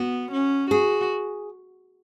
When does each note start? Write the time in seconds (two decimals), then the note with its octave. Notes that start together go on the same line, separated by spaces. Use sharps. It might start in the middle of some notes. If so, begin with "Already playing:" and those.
Already playing: B3 F#4
0.32 C#4
0.71 F#4 G#4